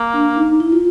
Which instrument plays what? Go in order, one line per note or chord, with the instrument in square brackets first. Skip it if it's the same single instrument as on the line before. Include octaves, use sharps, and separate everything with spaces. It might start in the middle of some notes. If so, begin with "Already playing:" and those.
Already playing: [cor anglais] A#3
[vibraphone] D4
D#4
E4
F4